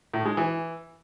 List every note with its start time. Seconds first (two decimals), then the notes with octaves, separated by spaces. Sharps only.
0.14 A2
0.25 G#3
0.37 E3